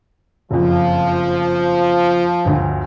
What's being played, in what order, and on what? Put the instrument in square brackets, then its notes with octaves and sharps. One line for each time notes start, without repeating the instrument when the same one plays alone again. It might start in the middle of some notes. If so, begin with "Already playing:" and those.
[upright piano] F#1 F2 [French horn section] F3
[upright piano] G1 D2